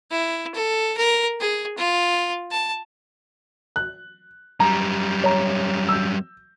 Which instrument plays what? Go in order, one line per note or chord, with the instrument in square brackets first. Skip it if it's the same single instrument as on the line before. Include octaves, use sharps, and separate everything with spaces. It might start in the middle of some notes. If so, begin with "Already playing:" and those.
[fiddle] E4
A4
A#4
G#4
F4
A5
[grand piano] F#6
[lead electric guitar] F#2 G3 [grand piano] A#5
[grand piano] C#5 A#5
E6 G6